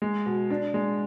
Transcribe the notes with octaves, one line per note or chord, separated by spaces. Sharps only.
G#3
B2
D4
G#3